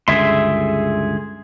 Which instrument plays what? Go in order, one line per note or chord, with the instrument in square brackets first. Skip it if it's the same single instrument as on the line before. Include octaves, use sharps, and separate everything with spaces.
[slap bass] C#2 G2 D3 [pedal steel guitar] G#4 E5 C6